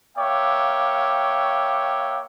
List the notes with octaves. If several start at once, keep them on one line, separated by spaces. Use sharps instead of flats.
A#3 C#5 E5 F5 G5 D6